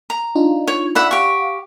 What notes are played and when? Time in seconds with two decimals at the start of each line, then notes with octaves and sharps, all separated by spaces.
0.10 A#5
0.35 D4 D#4 F4
0.68 C#5
0.95 D5 E5 F#5 G#5 B5 F#6
1.11 G4 F5 F#5 C#6